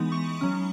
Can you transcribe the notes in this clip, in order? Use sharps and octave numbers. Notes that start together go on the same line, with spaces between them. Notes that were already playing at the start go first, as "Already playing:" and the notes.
Already playing: E3 G#3 B3 D#4
C#6
F#3 C#4